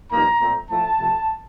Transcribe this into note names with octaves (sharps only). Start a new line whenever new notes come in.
G2 F3 A#3 D#4 A#5
A#2 A3 C4
A2 F3 A3 A5
C3 F3 A3